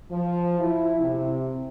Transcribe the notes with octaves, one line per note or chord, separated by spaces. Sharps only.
F3
E4
C3